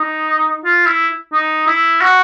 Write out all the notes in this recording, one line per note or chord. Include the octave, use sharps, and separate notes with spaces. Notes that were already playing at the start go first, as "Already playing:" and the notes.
Already playing: D#4
F4
E4
D#4
E4
F#4